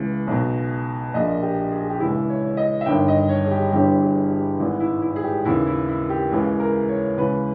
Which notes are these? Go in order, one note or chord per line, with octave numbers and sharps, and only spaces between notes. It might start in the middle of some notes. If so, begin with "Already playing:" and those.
Already playing: C#2 C#3 E3
B1 B2
A#1 A#2 D#5
G4
G#4
G4
C#2 C#3 E3 E4
C#5
D#5
E5
G1 G2 D#3 G5
D#5
C#5
G#4
G4
G1 G2 E3 G4
G#4
G4
G#1 G#2 E3 E4
E4
E4
G#4
G4
D#2 C#3 E3 E4
E4
E4
G4
C#2 C#3 E3 G#4
A#4
C#5
C#2 C#3 E3 B4